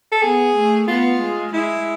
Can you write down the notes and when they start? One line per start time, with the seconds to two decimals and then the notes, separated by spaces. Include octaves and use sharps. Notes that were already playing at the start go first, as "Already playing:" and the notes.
0.12 A4
0.22 B3 G#4
0.55 A3
0.88 B3 F4
1.20 G#3
1.53 G#3 E4